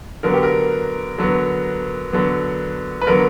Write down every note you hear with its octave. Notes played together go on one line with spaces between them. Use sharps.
D3 F#3 B3 A#4
G4
A#4
D3 F#3 B3
D3 F#3 B3
B4
D3 F#3 B3 A#4